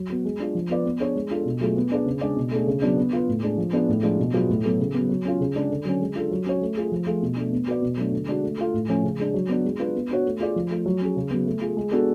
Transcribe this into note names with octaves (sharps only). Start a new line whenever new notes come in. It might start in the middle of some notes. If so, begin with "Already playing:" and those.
Already playing: F#3
B3 F#4
G#3
D4 F4
F3
B3 F4 B4 D5
B3
D4 G#4 C#5
G#3
D4 F4 A4
B2
F#3 A3 F4 G#4
B3
D4 G#4 B4 D5
C#3
G#3 D4 G#4 D5
B2
A3 D4 G#4
C#3
F#3 B3 D4
B3
F4 B4
A2
G#3 D4 G#4
F3
B3 D4 F4 G#4
A2
F3 G#3 D4 F4
B2
F#3 B3 F4 G#4
A2
F#3 B3 F#4 A4
C#3
F#3 B3
F#3
C#4 F4
C#3
G#3 D4 G#4
D3
F#3 C#4
G#3
D4 F4 A4
F#3
C#4 F#4 C#5
A3
F4 G#4
F3
A3 F4 G#4
B2
A3 D4
B3
F#4 B4 D5
B2
F#3 A3 D4 F#4
D3
G#3 D4 F#4
A3
F4 A4
A2
F3 A3 C#4
C#3
G#3 D4
F#3
B3 D4 F#4
G#3
D4 F4 B4
B3
D4 F#4 C#5
A3
F4 G#4 D5
F3
A3 F4
F#3
C#4 G#4
C#3
F#3 B3
A3
F4 G#4
G#3
B3 D4 F#4 A4